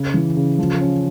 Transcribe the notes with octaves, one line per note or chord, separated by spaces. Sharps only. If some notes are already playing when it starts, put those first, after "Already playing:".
Already playing: C#3
E3
C#3
F3
C#4